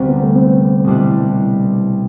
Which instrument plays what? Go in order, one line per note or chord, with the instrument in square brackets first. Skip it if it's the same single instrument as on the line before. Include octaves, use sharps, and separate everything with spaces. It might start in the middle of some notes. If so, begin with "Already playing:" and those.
Already playing: [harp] D2 C3 G3 D4 [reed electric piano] C4
[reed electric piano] B3
A3
C4
[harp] C2 B2 G3 D4